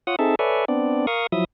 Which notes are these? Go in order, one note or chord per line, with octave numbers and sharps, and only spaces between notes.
F4 C#5 F#5 D#6
C4 D#4 G#4 A4 E5 A5
A4 B4 C#5 D5 E5 G#5
B3 C4 D4 D5
A#4 F5 C#6 D#6
F3 F#3 E4 E5 D#6